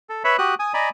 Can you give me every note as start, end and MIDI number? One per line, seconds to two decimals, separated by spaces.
0.09 0.23 69
0.24 0.37 71
0.24 0.37 73
0.24 0.37 76
0.24 0.37 83
0.39 0.55 66
0.39 0.55 67
0.39 0.55 87
0.39 0.55 90
0.59 0.74 80
0.59 0.74 87
0.74 0.89 74
0.74 0.89 75
0.74 0.89 80
0.74 0.89 82
0.74 0.89 83